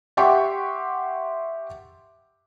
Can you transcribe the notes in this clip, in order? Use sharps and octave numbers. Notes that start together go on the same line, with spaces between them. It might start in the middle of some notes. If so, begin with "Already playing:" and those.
G4 E5 F#5 G5 C6 C#6